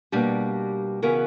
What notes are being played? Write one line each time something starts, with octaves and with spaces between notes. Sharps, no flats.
B2 G3 A#3 D4 G4
C#3 E3 B3 F#4 A#4